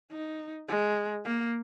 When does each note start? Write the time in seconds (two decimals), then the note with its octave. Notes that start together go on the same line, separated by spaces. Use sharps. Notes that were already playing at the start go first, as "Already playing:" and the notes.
0.11 D#4
0.68 G#3
1.25 A#3